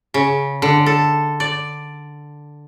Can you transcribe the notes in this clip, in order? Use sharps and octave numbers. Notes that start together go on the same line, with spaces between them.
C#3
D3
A4
D5